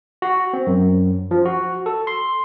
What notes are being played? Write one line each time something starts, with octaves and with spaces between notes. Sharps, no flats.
F#4
C4
F#2
F3
F#4
A4
C6